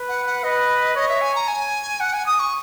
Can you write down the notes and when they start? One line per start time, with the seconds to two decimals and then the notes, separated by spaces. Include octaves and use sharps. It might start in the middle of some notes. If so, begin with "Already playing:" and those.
Already playing: B4
0.08 F#5
0.26 F#5
0.44 B4 D#5
0.96 C#5 D#5
1.08 E5
1.21 G#5
1.35 A#5
1.48 G#5
2.00 F#5
2.13 G#5
2.26 D#6
2.39 C#6